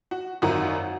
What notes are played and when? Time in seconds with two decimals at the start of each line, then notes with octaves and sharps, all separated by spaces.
0.11 F#4
0.42 G#1 F#2 D#3 F#4